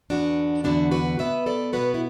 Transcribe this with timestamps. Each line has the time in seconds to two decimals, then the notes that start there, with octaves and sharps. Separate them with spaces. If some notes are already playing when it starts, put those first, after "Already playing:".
0.10 E2 D3 B3 D4 F#4
0.64 E2 D3 B3 D4 F#4
0.91 F#4 B4
1.19 B2 B3 B4 E5
1.46 A4 D5
1.73 B2 B3 F#4 B4
1.94 E4